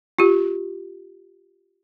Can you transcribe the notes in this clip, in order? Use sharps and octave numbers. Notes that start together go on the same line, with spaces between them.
F4 G4